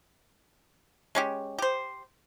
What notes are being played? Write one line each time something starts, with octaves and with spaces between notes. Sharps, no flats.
G#3 C#4 G4
G4 C5